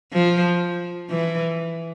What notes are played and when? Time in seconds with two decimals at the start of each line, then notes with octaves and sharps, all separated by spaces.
0.13 F3
1.10 E3